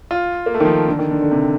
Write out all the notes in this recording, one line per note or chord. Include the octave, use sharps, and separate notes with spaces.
F4
A#3
A3
D#3
F3
D3
D#3
D3
D3
C3